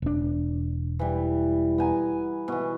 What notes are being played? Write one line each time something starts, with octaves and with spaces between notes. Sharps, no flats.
E1 D4
E3 G3
B3 G#5 A#5
B2 E3